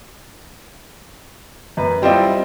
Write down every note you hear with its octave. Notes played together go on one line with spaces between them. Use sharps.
F#2 B4
G3 C4 E4 F4 D5 D#5